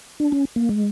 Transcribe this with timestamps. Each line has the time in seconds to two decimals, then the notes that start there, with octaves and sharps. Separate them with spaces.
0.20 D4
0.32 C#4
0.56 A#3
0.69 G#3